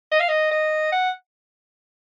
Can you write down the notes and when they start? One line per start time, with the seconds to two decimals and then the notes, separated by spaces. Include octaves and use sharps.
0.12 D#5
0.20 F5
0.29 D#5
0.51 D#5
0.92 F#5